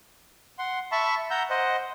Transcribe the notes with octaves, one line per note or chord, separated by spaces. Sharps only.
F#5 C6
E5 A5 B5 C#6
F#5 A#5 E6 G6
C5 D#5 F#5